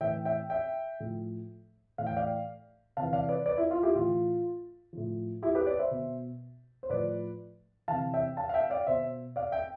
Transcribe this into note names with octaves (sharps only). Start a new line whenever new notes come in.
A2 E3 E5 G5
E5 G5
E5 G5
A2 F3
A2 E3 F5
G5
D5 F5
C3 E3 F5 A5
D5 F5
B4 D5
B4 D5
E4
F4
E4 G4
A2 E3 F4
A2 F3
E4 G4
G4 B4
B4 D5
C5 E5
B2
C5
A2 F3 B4 D5
C3 E3 F5 A5
E5 G5
F5 A5
F5
E5 G5
D5 F5
B2 C5 E5
D5 F5
E5 G5